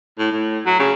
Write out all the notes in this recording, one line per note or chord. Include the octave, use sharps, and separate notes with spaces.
A2
A2
F#3
C#3